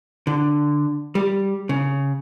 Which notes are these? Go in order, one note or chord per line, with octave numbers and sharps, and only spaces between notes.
D3
G3
C#3